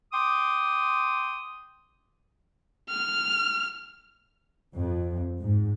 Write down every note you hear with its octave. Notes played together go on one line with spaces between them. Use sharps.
G5 C6 D6 D#6
F6
F2
G#2